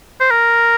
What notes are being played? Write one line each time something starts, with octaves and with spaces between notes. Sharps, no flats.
C5
A#4